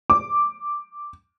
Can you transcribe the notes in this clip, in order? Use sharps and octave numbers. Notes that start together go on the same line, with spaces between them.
D6